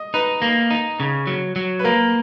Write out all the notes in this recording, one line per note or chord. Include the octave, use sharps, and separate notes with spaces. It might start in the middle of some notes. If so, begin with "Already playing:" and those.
Already playing: D#5
D#4 B4
A#3
D#4
C#3
F#3
F#3
B4
A#3 A#4